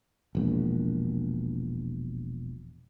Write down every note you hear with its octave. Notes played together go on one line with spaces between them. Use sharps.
E1 A#1